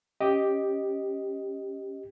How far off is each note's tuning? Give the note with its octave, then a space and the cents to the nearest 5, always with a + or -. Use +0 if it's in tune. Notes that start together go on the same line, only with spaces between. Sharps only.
C#4 +0 G4 +0 D#5 +0